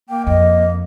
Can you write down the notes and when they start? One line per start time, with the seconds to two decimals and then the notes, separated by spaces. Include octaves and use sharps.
0.09 A#3 G5
0.27 F2 D#5